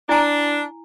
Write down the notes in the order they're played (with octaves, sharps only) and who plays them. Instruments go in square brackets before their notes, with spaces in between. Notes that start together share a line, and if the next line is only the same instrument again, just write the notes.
[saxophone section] D4 [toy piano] E4 G#5 A#5